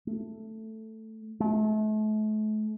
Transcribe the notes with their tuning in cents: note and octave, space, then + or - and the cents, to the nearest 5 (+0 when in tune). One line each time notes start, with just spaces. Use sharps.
A3 +5
A3 -40